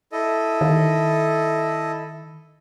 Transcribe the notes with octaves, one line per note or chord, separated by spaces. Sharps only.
E4 A4 D#5
D#3